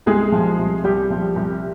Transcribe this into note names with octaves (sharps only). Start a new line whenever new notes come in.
C2 G#3 G#4
F3
C2
C2 G3 G4
F3
C2